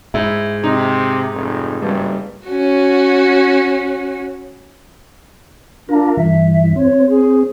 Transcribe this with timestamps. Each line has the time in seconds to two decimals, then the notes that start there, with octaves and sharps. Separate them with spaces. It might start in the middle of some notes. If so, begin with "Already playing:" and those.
0.14 G#2 E4
0.64 C3 D#4
1.34 F1
1.82 F#1 G2
2.46 C#4 F#4
5.89 D4 F4 A#4
6.17 G2 E3 E5
6.76 C4 C#5
7.09 G#4